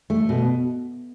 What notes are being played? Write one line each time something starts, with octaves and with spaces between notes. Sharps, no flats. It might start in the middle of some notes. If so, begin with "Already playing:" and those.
A3
B2